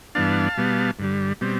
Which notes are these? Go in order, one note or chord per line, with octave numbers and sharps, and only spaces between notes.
G2 E3 B3 D4 F5 A5
B2 G3 B3
G2 D3 G3
B2 G3 C4